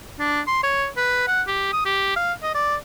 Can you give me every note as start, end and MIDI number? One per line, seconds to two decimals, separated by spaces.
0.19 0.41 62
0.48 0.62 84
0.63 0.88 73
0.97 1.24 71
1.28 1.42 78
1.47 1.70 67
1.73 1.85 87
1.85 2.16 67
2.16 2.33 77
2.43 2.53 75
2.55 2.76 74